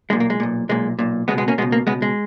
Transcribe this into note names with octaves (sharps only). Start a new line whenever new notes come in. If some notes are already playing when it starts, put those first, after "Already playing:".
B1 A#2 G#3
A#3
G#3
B1 A#2
B1 A#2 G#3
B1 A#2
C#2 B2 G#3 B3
G#3 B3
A#3 C#4
C#2 B2 G#3 B3
A#3
C#2 B2 G#3 B3
G#3